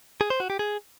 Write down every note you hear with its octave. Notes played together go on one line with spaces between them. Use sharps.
G#4
C5
F#4
G4
G#4